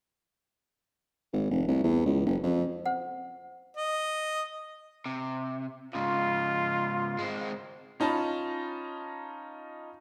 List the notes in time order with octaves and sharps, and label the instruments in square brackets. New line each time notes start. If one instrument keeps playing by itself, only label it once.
[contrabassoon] G#1
F1
C2
E2
C#2
F#1
F2
[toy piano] C5 F#5
[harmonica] D#5
[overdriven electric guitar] C3
[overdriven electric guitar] G#2 C#3 [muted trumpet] F4
[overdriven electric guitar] G#3 C4
[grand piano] C#4 D#4 F4 A5 B5